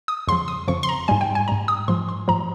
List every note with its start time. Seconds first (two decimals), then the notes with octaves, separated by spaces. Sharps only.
0.08 D#6
0.27 F2 C#3 F3 C6
0.48 D#6
0.68 F2 C#3 F3 C#6
0.83 C6
0.89 A#5
1.08 G#2 G3 G#5
1.21 G5
1.35 G#5
1.48 G#2 G3 A#5
1.68 D#6
1.88 G#2 F3 C6
2.09 C6
2.28 G#2 F3 A#5